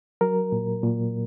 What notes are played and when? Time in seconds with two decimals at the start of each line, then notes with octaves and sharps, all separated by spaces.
0.21 F#3 A#4
0.52 A#2
0.83 A#2